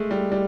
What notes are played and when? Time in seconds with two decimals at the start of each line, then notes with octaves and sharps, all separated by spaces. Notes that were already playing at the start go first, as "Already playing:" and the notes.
Already playing: G#3 A3
0.11 G3
0.32 G3